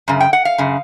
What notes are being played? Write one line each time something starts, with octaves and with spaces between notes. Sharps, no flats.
F#2 C#3
G5
F#5
F5
F#2 C#3